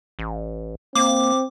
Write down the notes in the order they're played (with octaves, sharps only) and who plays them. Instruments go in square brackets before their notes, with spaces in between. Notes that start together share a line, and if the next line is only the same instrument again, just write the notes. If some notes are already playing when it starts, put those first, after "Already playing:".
[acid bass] A1
[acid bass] A#3 [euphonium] C4 [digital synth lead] D6